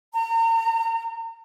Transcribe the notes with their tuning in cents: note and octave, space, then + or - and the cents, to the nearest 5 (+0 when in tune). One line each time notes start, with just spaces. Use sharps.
A#5 -35